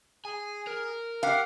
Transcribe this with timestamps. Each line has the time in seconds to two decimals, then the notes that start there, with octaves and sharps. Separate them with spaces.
0.25 G#4 G#5
0.67 A#4
1.23 G4 F5 F#5